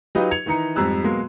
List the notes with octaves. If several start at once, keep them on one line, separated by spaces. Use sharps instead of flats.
F#3 D#4 F4 G4 B4 D#5
G#6 C#7 F7
D#3 E3 D#4 A#5 C#7
F2 G#2 G3 A#5 E6 F#6
B2 F#3 G#3 A#3